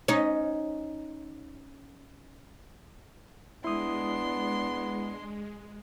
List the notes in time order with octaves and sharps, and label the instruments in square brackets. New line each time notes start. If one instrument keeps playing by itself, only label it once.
[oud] C#4 D#4
[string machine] G#3 [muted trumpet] B3 [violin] D4 C6 [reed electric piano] E4 D#6